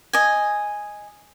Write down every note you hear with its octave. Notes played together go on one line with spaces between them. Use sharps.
D#5 G#5